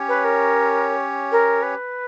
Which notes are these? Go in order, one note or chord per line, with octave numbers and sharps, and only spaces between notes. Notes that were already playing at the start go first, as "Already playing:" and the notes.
Already playing: C#4 G4 C#5
B4
A#4
A#4
B4